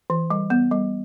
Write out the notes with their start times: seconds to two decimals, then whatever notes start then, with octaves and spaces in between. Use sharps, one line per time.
0.10 E3
0.30 G3
0.50 B3
0.71 G3